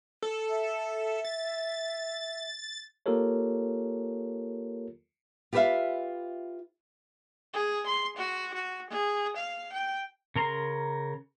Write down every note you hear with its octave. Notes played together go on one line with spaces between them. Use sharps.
A4
E5
A6
A#3 F4 G4 A4 A#4 C#5
F4 G4 B4 C5 E5 F5
G#4
C6
F#4
F#4
G#4
F5
G5
C#3 A#4 A#5 C6